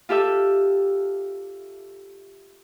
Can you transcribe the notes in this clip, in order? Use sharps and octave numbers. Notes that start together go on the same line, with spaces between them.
F4 G4 A4 E5 E6